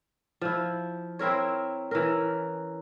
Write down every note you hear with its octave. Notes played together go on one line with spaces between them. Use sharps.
F3 E4
C4 E4 A#4 C#5
E3 C#4 A#4